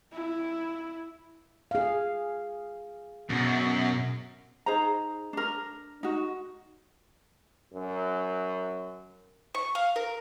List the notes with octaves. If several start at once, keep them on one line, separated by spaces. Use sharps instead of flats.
E4
G#4 F5
F#2 B2
D#4 G#4 C5 A#5
D4 A#4
D#4 F#4
F#2
C#6
F5
A#4